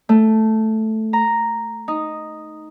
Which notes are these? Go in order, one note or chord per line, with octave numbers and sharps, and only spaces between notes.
A3
A#5
D#4